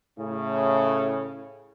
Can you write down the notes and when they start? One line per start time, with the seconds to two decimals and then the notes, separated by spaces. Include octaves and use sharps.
0.17 A2 C#3